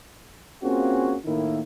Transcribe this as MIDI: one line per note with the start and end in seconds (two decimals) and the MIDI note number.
0.63 1.16 58
0.63 1.16 60
0.63 1.16 61
0.63 1.16 65
0.63 1.16 66
0.63 1.16 68
1.25 1.61 45
1.25 1.61 51
1.25 1.61 58
1.25 1.61 63
1.25 1.61 64